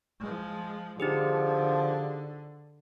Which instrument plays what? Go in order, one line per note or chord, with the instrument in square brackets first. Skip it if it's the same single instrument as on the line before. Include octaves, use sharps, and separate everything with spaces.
[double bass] F3 G#3
[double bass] D3 [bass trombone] F3 [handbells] D#4 G4 G#4